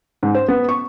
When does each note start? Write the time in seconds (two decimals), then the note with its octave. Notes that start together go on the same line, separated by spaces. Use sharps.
0.23 G#2
0.35 C5
0.48 B3
0.69 C#6